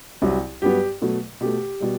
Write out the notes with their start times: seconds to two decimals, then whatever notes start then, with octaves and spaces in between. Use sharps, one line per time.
0.22 C2 C3 F#3
0.62 G2 F#3 B3 G4
1.02 B2 F#3 A3
1.41 B2 A3 G4
1.80 B2 G3